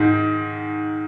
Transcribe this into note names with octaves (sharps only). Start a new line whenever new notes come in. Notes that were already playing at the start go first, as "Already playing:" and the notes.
Already playing: G#2 D#3